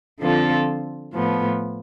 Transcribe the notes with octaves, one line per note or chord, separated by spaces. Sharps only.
D3 F3 C4 F4 A4
A2 F3 B3